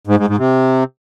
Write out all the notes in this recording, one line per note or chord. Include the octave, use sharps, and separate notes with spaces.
G#2
G#2
G#2
C3